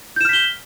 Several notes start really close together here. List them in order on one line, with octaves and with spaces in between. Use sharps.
G6 E7 F6 B6 G7